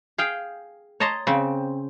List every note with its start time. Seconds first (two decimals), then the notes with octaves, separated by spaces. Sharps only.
0.18 G#4 F5 G5
1.00 C#5 D#5 A5 A#5 C6
1.27 C#3 C4